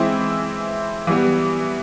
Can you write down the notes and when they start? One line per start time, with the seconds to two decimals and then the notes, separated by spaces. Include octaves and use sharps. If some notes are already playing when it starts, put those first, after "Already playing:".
Already playing: E3 G#3 C4 E4
1.07 E3 G3 B3